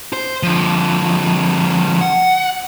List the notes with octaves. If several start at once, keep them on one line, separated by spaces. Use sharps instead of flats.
C5
D3 F3
F#5